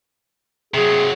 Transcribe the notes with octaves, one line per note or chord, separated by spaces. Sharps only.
C3 F#3 G#4